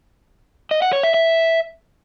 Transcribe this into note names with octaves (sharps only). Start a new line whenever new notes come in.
D#5
F#5
C#5
E5
E5